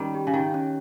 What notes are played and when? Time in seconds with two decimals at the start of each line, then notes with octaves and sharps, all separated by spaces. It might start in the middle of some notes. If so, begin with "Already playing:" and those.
Already playing: D#3 G3 C#4
0.14 G4
0.27 C#3
0.34 D#3 G4
0.54 C#4